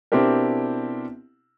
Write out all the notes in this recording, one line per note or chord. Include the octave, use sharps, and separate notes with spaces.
B2 C4 D4 E4 G4 A#4